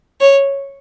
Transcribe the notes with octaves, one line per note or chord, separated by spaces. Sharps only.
C#5